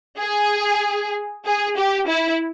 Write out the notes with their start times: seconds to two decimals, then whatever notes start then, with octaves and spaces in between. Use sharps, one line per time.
0.19 G#4
1.45 G#4
1.77 G4
2.08 E4